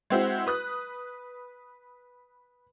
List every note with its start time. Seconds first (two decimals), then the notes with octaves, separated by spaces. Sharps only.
0.10 G#3 C4 E4 F#4
0.47 B4 D#6 F#6